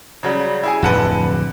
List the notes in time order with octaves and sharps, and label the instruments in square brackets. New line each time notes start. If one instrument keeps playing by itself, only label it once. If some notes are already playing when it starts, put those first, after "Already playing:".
[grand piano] C#3 F#3 G3
E4 G#4 G#5
[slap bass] D1 F2 D3 [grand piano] B4 F#5 A5